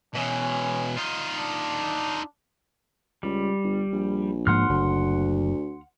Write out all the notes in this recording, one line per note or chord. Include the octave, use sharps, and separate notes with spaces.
B2 E3 C#4
D#4 F4
D4
C#2 G3
G1
A#1
G#2 F3 A#3 F#5 C6 F6
F#1 D2